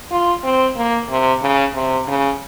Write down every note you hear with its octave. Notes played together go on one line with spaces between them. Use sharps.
F4
C4
A#3
C3
C#3
C3
C#3